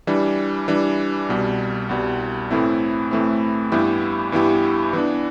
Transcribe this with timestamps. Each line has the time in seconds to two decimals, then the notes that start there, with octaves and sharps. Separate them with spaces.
0.07 E3 G3 D4
0.68 E3 G3 D4
1.29 C2 B2 G3
1.89 C2 B2 G3
2.51 A2 E3 A3 C4 E4
3.11 A2 E3 A3 C4 E4
3.72 G2 E3 B3 E4 G4
4.32 G2 E3 B3 E4 G4
4.93 E3 B3 D4